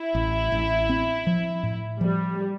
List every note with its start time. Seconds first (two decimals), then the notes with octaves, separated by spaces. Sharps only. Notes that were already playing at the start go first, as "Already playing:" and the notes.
Already playing: E4
0.15 A1
0.52 A1
0.89 C4
1.27 F3
1.63 A2
2.01 F3 G3